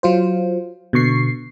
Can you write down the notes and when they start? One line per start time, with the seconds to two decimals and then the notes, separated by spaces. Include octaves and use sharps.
0.03 F#3 F4 C5
0.93 B2 D3 C#6 C7